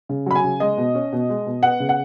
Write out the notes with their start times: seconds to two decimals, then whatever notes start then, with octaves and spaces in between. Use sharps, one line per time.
0.09 C#3
0.26 F#3 B5
0.35 G#5
0.44 C#3
0.60 G#3 D#5
0.78 B2
0.95 C#4
1.12 B2
1.29 G#3
1.46 B2
1.63 B3 F#5
1.80 C#3
1.89 F#5